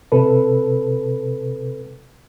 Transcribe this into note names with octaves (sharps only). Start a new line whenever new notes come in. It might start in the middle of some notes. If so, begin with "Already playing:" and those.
C3 A4 B4